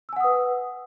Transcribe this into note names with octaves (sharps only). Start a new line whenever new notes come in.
B4 F#5 G#5 D#6 E6